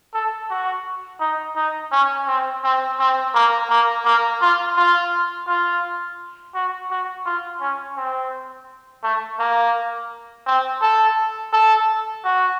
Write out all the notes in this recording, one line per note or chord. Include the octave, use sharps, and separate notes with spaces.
A4
F#4
D#4
D#4
C#4
C4
C4
C4
A#3
A#3
A#3
F4
F4
F4
F#4
F#4
F4
C#4
C4
A3
A#3
C4
A4
A4
F#4